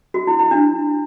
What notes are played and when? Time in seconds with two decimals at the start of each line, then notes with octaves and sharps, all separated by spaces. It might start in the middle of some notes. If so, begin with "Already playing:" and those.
0.14 F#4
0.27 E4
0.39 E4
0.51 D4